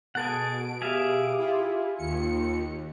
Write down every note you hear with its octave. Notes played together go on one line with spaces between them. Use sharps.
B2 G#4 A4 F#5 D7
G4 G#4 E5 F5
E4 F4
D#2 F4 C#7